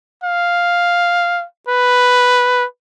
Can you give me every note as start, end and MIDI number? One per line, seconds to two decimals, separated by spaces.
0.24 1.44 77
1.68 2.65 71